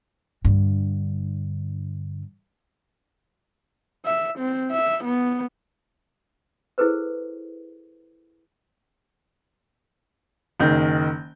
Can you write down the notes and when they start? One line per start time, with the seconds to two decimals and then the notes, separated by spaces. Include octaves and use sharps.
0.45 G2 D3
4.06 E5
4.39 C4
4.72 E5
5.05 B3
6.78 E4 G#4 A4 B4 C5
10.60 F#1 D#3 G6